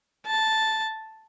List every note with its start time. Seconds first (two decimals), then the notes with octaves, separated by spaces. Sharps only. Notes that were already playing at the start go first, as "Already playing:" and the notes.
0.26 A5